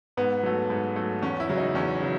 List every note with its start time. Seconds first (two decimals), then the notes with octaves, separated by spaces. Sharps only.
0.17 G#2 B3
0.43 F#3 A3
0.70 G#2
0.96 F#3 A3
1.22 E2 C#4
1.40 E4
1.49 C#3 F#3
1.58 D#4
1.75 E2 C#4
2.02 C#3 F#3